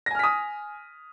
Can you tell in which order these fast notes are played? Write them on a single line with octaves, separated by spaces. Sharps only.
A#6 G#5 F6 B6 D#6